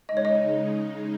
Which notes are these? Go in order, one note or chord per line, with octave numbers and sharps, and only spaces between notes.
C#3 G#3 D#4 D#5
C#5
D#5